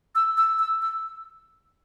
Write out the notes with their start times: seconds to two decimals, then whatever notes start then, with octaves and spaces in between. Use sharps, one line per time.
0.15 E6
0.37 E6
0.59 E6
0.82 E6